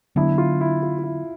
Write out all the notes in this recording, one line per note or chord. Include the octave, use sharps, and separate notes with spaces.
D3 F#3 B3 D4 E4
F4
E4
F4
F4
E4